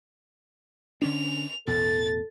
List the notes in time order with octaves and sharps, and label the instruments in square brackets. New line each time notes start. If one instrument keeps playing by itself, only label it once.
[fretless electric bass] D3 C#4 D4 [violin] F7
[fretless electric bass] A1 E2 B2 [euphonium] A4 [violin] A6